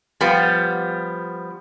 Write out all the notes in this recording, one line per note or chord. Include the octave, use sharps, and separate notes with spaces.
F3 G3 B3